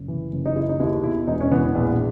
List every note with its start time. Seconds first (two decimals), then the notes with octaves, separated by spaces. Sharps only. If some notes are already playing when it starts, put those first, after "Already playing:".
Already playing: F#1
0.08 E3
0.32 F#1
0.46 D#4
0.56 G#3 E4
0.69 D#4
0.80 D#2 E4
1.03 B2 E4
1.27 E1 D#4
1.40 C#4
1.51 E3 B3
1.75 A#1 B3